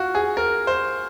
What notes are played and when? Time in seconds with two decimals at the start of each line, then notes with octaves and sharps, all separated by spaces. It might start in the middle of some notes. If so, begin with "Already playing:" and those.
Already playing: F4 F#4
0.15 G#4
0.37 A#4
0.67 C5